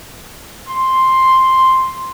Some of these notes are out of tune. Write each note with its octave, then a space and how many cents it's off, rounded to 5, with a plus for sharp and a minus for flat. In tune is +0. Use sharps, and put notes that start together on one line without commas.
C6 +5